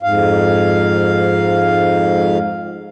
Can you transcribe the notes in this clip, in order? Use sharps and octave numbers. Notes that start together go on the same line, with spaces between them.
F2 G#2 F5